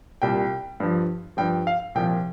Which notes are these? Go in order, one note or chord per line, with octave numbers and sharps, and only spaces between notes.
C2 A#2 G3 G5
G2 F3
G2 F3 G5
F5
C2 A#2 F3 G5